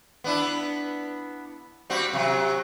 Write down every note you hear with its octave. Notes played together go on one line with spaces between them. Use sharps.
B3 D4 E4
G3 C4 F#4
C3 F#3